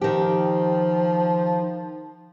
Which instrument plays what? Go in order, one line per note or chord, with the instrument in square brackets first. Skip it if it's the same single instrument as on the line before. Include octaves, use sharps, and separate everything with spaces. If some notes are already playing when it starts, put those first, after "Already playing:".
[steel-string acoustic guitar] D#3 G4 [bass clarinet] F3